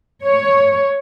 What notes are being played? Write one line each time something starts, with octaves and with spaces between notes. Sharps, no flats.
C#5